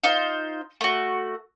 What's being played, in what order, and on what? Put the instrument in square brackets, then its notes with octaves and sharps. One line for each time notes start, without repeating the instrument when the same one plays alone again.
[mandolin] D#4 F4 C5
A3 F#4